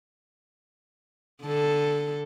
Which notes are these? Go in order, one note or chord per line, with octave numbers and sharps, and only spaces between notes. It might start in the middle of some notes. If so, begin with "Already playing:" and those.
D3 A4